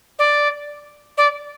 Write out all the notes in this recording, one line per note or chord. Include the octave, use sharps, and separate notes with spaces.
D5
D5